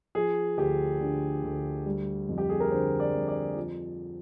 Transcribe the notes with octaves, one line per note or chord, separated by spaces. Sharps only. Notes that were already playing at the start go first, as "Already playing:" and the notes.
F3 G#4
D2 G4
D3
D2
G3
F2
G4
G#4
A#4
D3 C5
D5
F2
D5
F3